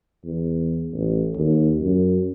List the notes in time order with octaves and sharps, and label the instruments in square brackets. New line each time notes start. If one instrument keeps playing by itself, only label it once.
[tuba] E2
A1
D#2
F#2